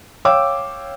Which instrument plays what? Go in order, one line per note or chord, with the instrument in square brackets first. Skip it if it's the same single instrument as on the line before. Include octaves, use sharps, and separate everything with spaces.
[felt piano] C#5 F5 G5 D6 E6